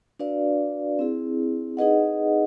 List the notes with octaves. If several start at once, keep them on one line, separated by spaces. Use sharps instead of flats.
D4 F#4 B4 D5 F5
C4 E4 G#4
D#4 G#4 B4 D#5 F#5